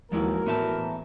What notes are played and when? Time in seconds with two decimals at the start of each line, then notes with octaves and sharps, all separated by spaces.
0.12 D#2 E3 F3 G#3 E4 F#4 A#4
0.47 A2 E3 B3 E5 A5